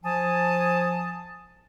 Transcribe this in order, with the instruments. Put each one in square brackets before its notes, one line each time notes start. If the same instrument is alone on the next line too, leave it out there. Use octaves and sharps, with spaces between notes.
[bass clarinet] F3 [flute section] G#5 A5 D#6